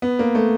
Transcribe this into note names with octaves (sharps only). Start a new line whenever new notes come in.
B3
A#3
A3